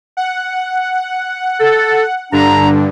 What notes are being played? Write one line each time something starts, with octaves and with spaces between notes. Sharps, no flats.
F#5
A4
G2 D3 D4 A#5